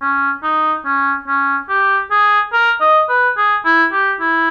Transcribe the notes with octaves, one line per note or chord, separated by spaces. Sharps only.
C#4
D#4
C#4
C#4
G4
G#4
A#4
D#5
B4
G#4
E4
G4
E4